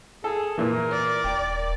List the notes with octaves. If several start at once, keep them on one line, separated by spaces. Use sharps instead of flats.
G#4 A4
A#2 E3 A#4
D5
D#1 G5